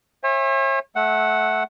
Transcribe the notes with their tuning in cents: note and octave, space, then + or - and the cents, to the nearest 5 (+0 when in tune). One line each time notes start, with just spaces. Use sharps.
C#5 -40 E5 +0 G#5 -40
A3 -20 F#5 +0 E6 -10